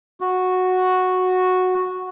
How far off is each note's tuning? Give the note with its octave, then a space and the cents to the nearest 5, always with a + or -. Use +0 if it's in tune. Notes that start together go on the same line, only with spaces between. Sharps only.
F#4 -5